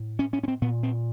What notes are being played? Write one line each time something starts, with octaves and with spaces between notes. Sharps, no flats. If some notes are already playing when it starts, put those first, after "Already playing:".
Already playing: A2
C#4
C#4
C#4
C4
A#2 B3
C4